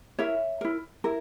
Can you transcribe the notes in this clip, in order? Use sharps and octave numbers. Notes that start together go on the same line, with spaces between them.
E4 A#4 C#5 E5
E4 A#4
E4 A#4